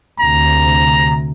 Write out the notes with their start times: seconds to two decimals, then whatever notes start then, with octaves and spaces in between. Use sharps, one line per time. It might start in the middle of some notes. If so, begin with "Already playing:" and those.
0.19 D2 C3 A#5